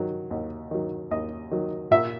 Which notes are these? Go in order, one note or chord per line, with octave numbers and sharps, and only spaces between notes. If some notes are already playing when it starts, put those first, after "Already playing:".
Already playing: D#3 F#3
D#2
D#3 F#3
D#2 D#5
D#3 F#3
A#2 E5